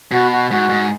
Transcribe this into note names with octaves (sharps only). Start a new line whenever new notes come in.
B2 F#4
F#4
G#2 F#4
G#2